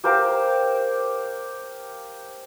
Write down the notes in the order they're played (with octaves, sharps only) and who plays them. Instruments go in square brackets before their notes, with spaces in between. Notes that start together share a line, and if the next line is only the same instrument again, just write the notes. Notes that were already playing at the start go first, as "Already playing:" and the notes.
[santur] G4 A#4 C5 F5